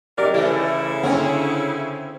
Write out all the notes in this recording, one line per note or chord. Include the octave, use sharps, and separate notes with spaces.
F#3 D#4 G4 A#4 D5
C#3 E3 A3 E4
D3 C4 C#4 F#5 G#5